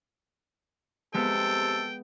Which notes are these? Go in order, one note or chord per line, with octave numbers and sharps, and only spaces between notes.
C3 G#3 B3 A4 G5